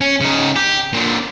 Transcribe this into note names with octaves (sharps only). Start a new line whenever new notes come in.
C#4
C#3 D#4
G4
A#2 D3